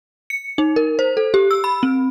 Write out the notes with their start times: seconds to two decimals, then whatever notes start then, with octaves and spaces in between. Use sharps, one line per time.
0.30 C#7
0.58 D#4
0.76 A#4
0.99 C5
1.17 A4
1.34 G4
1.51 E6
1.64 B5
1.83 C4